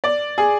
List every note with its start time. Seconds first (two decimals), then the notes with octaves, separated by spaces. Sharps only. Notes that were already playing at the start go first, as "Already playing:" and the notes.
0.04 D5
0.38 G#4